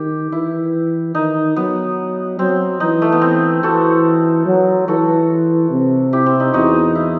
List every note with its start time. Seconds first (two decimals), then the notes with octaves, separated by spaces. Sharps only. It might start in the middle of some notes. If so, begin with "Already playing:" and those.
Already playing: D#3 G4
0.31 E3 E4
1.14 D#3 D#4
1.56 F#3 B3
2.39 F#3 C4
2.80 E3 D#4
3.02 A3
3.12 B3
3.22 C4
3.63 E3 F#4 A4
4.46 F#3
4.88 E3 F#4 A4
5.70 C3
6.13 E4 G4
6.26 C4
6.40 D#4
6.53 E2 D#4 F#4
6.95 E4